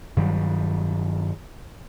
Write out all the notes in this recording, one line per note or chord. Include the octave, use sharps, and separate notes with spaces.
G2 D#3 F#3 G3